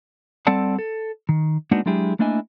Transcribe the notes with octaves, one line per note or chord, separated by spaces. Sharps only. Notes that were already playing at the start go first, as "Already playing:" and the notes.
G3 C4 A4 D5 F#5 A5
A4
D#3
G#3 A#3 B3 D4 D#4 F#4
F#3 G#3 D4 E4 G4 G#4
A3 A#3 D4 E4 D#5 G#5